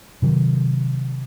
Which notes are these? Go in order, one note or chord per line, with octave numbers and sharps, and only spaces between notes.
C3 D#3 F#3